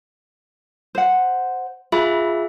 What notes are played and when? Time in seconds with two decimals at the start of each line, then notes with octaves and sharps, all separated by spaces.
0.95 C5 F#5
1.92 F4 G#4 E5 B5